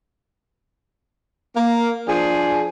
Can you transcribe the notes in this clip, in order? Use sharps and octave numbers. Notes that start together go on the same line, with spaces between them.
A#3
F3 D4 G#4